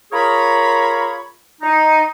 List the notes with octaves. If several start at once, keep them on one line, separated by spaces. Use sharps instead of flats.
F4 G#4 A#4 C#5 A#5 B5
D#4